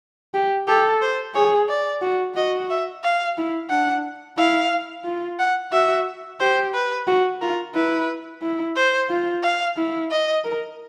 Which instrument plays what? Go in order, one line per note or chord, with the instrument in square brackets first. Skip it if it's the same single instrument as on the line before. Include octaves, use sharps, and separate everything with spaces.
[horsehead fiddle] G4
[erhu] G4 [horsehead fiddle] A4
[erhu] C5
[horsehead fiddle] G#4 [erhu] C#5
[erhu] D5
[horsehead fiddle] F#4
[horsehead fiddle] F#4 [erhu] D#5
[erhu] E5
F5
[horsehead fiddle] E4
[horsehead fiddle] D4 [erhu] F#5
[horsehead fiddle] E4 [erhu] F5
[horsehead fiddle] F4
[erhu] F#5
[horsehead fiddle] F#4 [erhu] E5
[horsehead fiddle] G4 [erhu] C5
[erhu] B4
[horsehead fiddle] F#4
[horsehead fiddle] F4 [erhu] A#4
[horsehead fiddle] E4 [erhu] B4
[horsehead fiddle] E4
[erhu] C5
[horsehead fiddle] F4
[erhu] F5
[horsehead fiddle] E4
[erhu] D#5
[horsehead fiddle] A#4